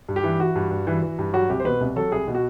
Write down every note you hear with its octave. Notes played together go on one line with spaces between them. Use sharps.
G2
G4
E3
E3 F#4
G2
G2
E3
E3
G2
F#3 F#4
C2 G4
C5
B2 B4
C2
F#3 A4
C2 G#4
B2
F#4